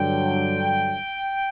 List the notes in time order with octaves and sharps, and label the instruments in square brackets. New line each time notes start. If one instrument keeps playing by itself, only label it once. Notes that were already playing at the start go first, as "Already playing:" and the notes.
Already playing: [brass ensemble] G2 D3 F#3 G5